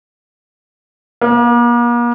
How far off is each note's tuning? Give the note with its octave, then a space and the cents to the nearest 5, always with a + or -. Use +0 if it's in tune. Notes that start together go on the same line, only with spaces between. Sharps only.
A#3 +40